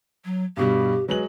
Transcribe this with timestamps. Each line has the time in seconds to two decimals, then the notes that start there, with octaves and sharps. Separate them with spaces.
0.25 F#3
0.57 G2 B2 G3 G4
1.09 F#3 G#3 B4 F#7